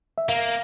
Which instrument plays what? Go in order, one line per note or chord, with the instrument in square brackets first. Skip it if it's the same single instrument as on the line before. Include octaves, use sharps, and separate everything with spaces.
[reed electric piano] E5
[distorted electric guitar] A#3 [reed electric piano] F5